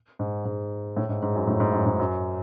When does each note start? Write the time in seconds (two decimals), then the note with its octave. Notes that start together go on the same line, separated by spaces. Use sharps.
0.19 G#2
0.45 G#2
0.97 A2
1.09 G#2
1.22 G#2
1.35 F#2
1.47 A2
1.60 G#2
1.72 F#2
1.86 G#2
1.99 F#2